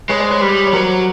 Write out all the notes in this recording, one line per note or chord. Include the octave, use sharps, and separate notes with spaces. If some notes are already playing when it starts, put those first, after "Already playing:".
G#3 B4 C#5
C5 D5
B4 C#5
G3
C#5
F#3 A#4 C5